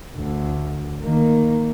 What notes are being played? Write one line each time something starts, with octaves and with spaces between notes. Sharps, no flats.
D2
D#3 A#3